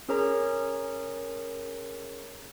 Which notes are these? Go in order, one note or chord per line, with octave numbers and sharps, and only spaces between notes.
C#4 G#4 A#4 C#5 A#5